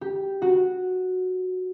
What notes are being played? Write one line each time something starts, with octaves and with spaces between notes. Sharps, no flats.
G4
F#4